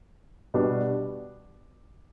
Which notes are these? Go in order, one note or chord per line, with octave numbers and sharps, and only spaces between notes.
B2 G3 B3 D4 F#4